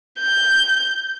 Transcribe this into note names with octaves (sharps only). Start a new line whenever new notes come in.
G6